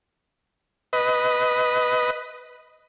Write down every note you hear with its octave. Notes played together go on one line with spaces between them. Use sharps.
B4 D#5